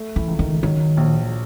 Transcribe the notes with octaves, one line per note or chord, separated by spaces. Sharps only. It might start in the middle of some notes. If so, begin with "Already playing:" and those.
Already playing: A3
E3
C#2
D#3
D#3 F#3
A#1